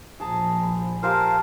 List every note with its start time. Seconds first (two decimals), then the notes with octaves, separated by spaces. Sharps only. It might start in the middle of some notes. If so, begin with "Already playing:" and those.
0.20 A#1 F3 G#4 A5 A#5
0.63 B5
1.03 F4 G4 A4 A#4 C5 F5